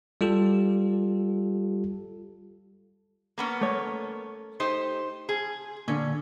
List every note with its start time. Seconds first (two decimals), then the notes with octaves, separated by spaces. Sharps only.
0.21 G3 F4 G4 A4
3.38 A#3 B3 C#4
3.61 A3 C#5
4.60 D#4 G4 C5
5.29 G#4
5.88 A#2 D3 C#4